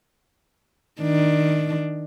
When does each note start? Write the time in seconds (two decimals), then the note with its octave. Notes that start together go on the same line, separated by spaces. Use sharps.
1.00 D#3 D4